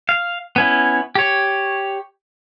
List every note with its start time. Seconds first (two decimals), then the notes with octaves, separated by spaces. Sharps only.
0.09 F5
0.56 B3 C#4 E4
1.15 G4 C#5